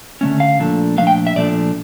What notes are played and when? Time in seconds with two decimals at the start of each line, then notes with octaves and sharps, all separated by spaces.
0.21 D3 A3 C#4
0.40 F5
0.59 A#2 F3 A3 D4
0.98 A#2 F3 A3 D4 F5
1.07 G5
1.27 E5
1.36 A#2 F3 A3 D4 D5